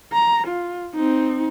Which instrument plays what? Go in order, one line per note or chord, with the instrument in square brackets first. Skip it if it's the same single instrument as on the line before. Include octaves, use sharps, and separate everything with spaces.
[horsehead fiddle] A#5
F4
C4 D#4